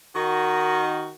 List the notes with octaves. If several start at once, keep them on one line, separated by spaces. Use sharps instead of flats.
D#3 F#4